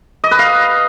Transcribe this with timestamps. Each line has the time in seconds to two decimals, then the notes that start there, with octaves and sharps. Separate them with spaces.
0.24 D#5
0.31 B4
0.39 F5